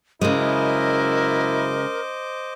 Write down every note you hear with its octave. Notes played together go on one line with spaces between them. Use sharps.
F#2 C#3 G#3 E4 A#4 C5 D#5 D6